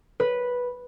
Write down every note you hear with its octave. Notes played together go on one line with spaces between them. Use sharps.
B4